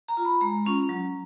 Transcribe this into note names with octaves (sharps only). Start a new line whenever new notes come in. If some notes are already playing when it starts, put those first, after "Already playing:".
A#5
F4
B5
G#3 A#5
C#4 F4
F#3